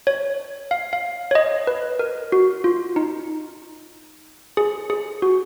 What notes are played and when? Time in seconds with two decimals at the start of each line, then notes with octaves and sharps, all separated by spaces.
0.07 C#5
0.71 F5
0.93 F5
1.31 C#5
1.35 D#5
1.67 B4
1.99 A#4
2.32 F#4
2.64 F4
2.96 D#4
4.57 G#4
4.90 G#4
5.22 F#4